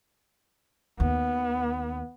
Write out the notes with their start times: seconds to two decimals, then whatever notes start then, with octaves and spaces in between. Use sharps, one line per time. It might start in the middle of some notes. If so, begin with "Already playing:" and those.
1.00 D#2 B3